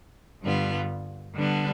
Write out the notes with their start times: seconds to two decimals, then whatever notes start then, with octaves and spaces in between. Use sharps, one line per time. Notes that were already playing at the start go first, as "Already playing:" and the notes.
0.42 G2 D3 G3 B3 F4
1.35 D3 G3 B3 D4